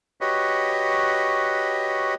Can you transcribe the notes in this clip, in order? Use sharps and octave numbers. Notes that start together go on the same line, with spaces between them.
F#4 G4 B4 C#5 D#5